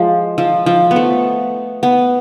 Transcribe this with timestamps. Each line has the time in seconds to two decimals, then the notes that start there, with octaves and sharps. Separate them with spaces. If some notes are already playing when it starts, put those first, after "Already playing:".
Already playing: F3 G#3
0.38 F3
0.66 F3
0.91 B3
0.96 A3
1.83 B3